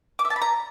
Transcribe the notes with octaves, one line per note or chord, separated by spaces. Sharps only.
D6
E5
A5
B5
A#5